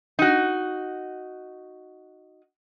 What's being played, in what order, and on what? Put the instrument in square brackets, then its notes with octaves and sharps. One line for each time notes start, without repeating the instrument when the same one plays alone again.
[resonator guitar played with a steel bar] D#4 F#4